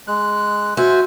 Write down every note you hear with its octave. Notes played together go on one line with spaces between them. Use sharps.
G#3 F#6
F#4 C5 E5 G#5